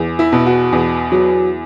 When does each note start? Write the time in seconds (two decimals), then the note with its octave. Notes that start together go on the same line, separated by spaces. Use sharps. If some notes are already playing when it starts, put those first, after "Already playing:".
Already playing: E2
0.19 E4
0.32 B2
0.46 F#4
0.72 E2
1.12 F#3